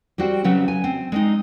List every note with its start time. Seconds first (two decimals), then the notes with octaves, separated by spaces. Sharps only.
0.18 G3 C4 F#4 C5 G5
0.44 C#3 F#3 C4 B4
0.68 G#5
0.84 C4
1.12 G#3 C4 D#4